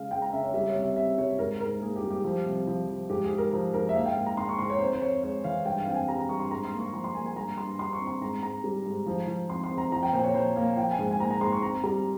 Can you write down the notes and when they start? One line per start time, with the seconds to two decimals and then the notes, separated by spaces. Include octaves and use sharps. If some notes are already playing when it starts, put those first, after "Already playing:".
Already playing: C#3 G#3 F5
0.11 G#3 G5
0.22 A#5
0.33 C#3 E5
0.43 C#5
0.54 G3 E5
0.68 C#5
0.75 C2
0.82 E5
0.96 C3 E5
1.18 G3 C#5
1.39 G#2 A#4
1.60 G#2 A#4
1.81 A#3 G#4
1.96 G4
2.03 G3
2.10 G4
2.24 F3
2.46 C2
2.67 F3
2.88 F3
3.09 G#2 G4
3.24 G#4
3.31 G#3
3.38 A#4
3.53 F3 A#4
3.74 G#2 A#4
3.89 E5
3.95 A#3 F5
4.06 G5
4.16 G#2
4.26 A#5
4.37 G#2 C6
4.49 C#6
4.59 G#2 C6
4.70 C#5
4.80 F2 C5
4.93 C5
5.01 F2 C#5
5.23 G#3 C#5
5.44 E3 F5
5.65 G2 G5
5.79 F5
5.87 C4 G5
5.94 G#5
6.08 G3 A#5
6.19 A#5
6.29 G2 C#6
6.40 C6
6.51 G#2 A#5
6.65 C6
6.72 A#3
6.79 C#6
6.93 F3 C6
7.04 C6
7.15 A#3 G#5
7.26 G#5
7.36 G2 A#5
7.57 G2 C6
7.79 G2 C6
7.93 C#6
8.00 C4
8.07 C6
8.21 G#2 A#5
8.42 G#2 A#5
8.64 G3
8.86 G#2
9.06 F3
9.27 F3
9.50 C4 C6
9.64 C6
9.71 C4
9.78 A#5
9.92 F3 A#5
10.03 G5
10.13 A#2 C5
10.24 C#5
10.34 F3 C5
10.56 A#3 F5
10.77 F3 G5
10.91 G#5
10.99 G#2
11.11 G#5
11.20 A#3 A#5
11.31 A#5
11.41 G#2 C6
11.52 C#6
11.62 C4 A#5
11.84 G3 A#5